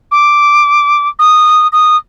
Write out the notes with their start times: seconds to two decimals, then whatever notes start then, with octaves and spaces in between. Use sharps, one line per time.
0.11 D6
1.19 D#6
1.72 D#6